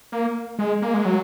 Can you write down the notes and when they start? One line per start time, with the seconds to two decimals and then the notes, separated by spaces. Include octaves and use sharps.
0.12 A#3
0.59 G#3
0.82 A#3
0.94 G#3
1.05 F#3